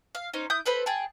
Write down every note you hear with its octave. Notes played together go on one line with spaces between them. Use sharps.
F5
C#4 D#4 C5
E4 D#6 G6
A4 B4 C5 B5
G#4 G5 A5